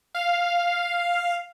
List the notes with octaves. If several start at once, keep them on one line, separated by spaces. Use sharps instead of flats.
F5